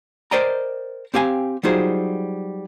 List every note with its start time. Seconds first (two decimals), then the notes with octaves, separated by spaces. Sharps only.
0.31 A#4 C5 D5 D#5 G5 A#5
1.14 C4 G4 F5 G#5
1.63 F#3 G3 D#4 F4 G#4 C5